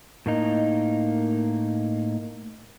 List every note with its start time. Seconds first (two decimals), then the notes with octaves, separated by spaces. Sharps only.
0.26 A2 A#3 D#4